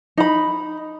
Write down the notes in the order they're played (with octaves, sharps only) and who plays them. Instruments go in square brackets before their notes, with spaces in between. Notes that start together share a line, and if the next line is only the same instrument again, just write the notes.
[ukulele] D#4 B5